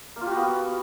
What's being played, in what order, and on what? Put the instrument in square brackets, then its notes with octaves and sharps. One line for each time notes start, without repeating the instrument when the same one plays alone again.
[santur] A#3
F4
G4
F#4
B3